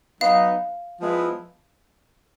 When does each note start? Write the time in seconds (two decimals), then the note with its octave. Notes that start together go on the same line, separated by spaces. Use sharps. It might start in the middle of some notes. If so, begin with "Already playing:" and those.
0.21 F#3 B3 D#4 F5
1.00 F3 G#3 B3 E4